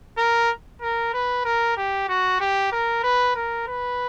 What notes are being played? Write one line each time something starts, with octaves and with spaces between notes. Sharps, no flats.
A#4
A#4
B4
A#4
G4
F#4
G4
A#4
B4
A#4
B4